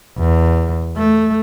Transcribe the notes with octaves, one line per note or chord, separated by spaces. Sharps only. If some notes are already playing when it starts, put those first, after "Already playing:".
E2
A3